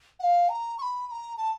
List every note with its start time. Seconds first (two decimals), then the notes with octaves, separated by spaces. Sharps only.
0.20 F#5
0.23 F5
0.49 A#5
0.78 C#6
0.82 B5
1.07 B5
1.11 A#5
1.37 A5